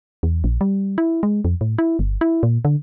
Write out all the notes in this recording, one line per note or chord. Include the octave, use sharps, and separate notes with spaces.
E2
A#1
G3
E4
G#3
F2
A2
E4
G1
E4
A#2
D3